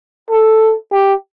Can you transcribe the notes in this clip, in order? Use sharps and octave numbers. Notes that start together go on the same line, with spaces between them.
A4
G4